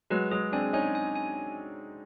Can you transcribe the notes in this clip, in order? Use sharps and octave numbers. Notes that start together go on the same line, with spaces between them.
F#3 G#3 B4
F#3 G#3 G#4
C4 D4 G#5
C#4 D#4 G#5
G#5
G#5